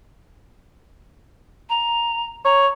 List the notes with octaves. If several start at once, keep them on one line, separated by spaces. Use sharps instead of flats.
A#5
C#5 A#5